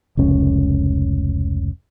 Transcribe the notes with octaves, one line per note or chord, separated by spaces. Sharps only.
F1 C#2 C#4